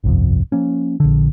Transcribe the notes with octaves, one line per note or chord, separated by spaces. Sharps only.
G1 C2 F2
F3 A#3 C#4
A#1 D3